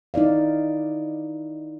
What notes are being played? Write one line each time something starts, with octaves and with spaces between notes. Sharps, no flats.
D#4 E4 D5 F5